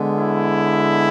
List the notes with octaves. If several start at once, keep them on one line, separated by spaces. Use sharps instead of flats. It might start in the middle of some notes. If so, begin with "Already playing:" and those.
Already playing: D3 G#3 B3
E4